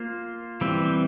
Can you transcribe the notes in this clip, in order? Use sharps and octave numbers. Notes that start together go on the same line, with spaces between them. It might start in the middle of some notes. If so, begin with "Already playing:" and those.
Already playing: A#3 F4 C5
E3 G3 C4